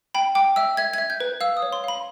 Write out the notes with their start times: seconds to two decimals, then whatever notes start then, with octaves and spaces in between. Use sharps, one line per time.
0.15 G5 B5
0.35 G5 D6
0.56 E5 E6
0.77 E5 G#6
0.94 E5 G#6
1.10 G6
1.20 B4
1.41 F5 E6
1.57 D#6
1.62 C#5
1.73 C6
1.84 F5 B5